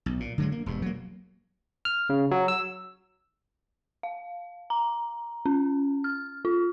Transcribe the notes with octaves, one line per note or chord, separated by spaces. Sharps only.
B1
A#2
D3 F#3 G#3
A#3
E1 G2
F#3 A#3
F6
C#3
F#3
E6
F5
A#5
C#4
F6
F4